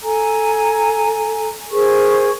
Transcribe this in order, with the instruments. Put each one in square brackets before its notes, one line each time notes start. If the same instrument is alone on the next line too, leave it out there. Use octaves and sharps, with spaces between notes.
[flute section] A4 G#5 A#5
G#4 A#4 C5 C#6